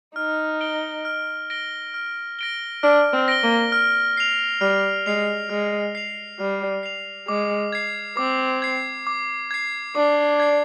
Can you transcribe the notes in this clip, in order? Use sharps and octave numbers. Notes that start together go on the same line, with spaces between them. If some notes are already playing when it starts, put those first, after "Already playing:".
D#4 F6
A#6 D7 G7
F6
A#6 D7 G7
F6
A#6 D7 G7
D4 F6
C4
A#6 D7 G7
A#3
F6
C7 F7
G3 F6
G#3 C7 F7
G#3 F6
C7 F7
G3 F6
C7 F7
G#3 D6
G#6 C7
C4 D6
G#6 C7
D6
G#6 C7
D4 D6
G#6 C7